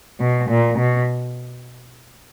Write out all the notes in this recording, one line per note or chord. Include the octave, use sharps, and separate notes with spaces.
B2
A#2
B2